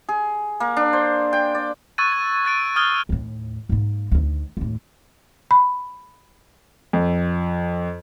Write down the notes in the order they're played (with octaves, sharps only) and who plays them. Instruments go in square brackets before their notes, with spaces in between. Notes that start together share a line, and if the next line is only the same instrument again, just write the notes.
[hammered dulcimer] G#4
A#3
D4
C5
G5
D5
[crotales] C#6 E6 F#6 G#6 A6 D#7
G#6
F#6 G#6 A6 D7 D#7
D#6 F6 F#6 G#6 G7
[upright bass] D#2 A2
G#2 A#3
D2 D#3
D#2 A2
[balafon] B5
[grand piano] F2